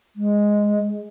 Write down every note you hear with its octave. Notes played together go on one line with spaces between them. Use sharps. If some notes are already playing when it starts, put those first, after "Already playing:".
G#3